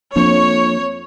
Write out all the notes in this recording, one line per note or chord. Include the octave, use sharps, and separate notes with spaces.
F2 F3 A#3 D4 C#5